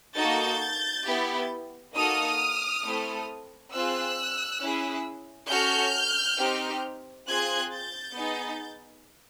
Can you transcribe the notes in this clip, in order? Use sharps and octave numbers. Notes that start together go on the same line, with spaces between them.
A#3 D#4 F#4 A4 G6 A6
B3 E4 G4
A#3 D#4 F#4 A4 D#6 F6
A3 C4 E4 A4
C4 F4 G#4 E6 F#6
C#4 E4 G#4
C#4 F#4 A4 F6 G6
C4 D#4 G4
C4 F4 G#4 F#6 G#6
G6 A6
B3 D#4 G#4